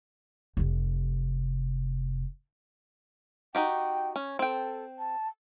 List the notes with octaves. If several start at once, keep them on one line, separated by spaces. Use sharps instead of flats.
F1 C3
D#4 F#4 G4 G5
C#4
C4 A4 G5
A5